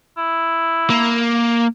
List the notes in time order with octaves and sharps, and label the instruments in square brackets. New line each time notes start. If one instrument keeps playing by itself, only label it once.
[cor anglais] E4
[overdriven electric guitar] A#3